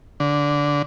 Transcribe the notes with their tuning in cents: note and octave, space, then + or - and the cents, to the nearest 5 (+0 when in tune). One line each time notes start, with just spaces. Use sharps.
D3 -15